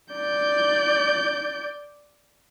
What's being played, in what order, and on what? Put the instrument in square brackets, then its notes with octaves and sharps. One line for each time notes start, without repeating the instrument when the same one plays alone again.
[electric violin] D5 G6